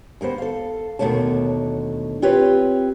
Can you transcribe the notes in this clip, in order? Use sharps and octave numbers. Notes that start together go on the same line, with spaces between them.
D#2 A#3 B3 C5
A4 F5
D#2 B2 D3 A3 C#5 A5
C4 F4 G4 B4 C#5